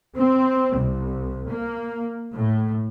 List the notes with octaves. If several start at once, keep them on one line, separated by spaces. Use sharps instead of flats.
C4
C2
A#3
A2